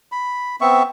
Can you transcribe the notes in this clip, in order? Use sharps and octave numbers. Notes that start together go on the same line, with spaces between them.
B5
B3 C4 E5 C#6